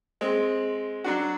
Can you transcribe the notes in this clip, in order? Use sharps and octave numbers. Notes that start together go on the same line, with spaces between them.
G#3 C4
F#3 D4 F#4